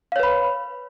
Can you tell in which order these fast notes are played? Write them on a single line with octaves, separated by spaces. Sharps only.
F5 C#5 B4 B5